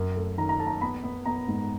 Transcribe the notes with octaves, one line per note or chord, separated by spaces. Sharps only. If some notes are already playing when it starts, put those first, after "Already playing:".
Already playing: F#2
A3
D#3 A#5
A#5
A3 A5
A#5
A5
B3 B5
B3
B3 A#5
G#2